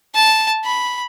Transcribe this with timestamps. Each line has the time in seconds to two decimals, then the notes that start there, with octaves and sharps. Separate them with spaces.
0.15 A5
0.65 B5